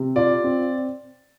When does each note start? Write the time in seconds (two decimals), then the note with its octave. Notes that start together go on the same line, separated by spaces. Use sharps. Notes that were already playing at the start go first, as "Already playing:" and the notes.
Already playing: C3
0.16 F4 D5
0.44 C4